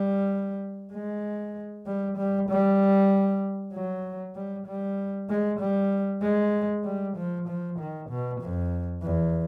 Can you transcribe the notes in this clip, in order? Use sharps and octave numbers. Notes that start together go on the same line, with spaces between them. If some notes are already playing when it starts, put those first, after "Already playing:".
Already playing: G3
G#3
G3
G3
G3
F#3
G3
G3
G#3
G3
G#3
G3
F3
F3
D#3
B2
F2
E2